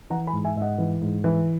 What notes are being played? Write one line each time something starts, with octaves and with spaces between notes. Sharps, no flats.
E3 F#5 A#5
G#5 B5
G#2
E5 G#5
G#2 E5
D#5 F#5
E3
G#2
E3